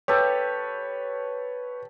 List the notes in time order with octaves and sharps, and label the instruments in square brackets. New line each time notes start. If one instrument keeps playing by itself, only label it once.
[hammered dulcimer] G4 A4 [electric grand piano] B4 C#5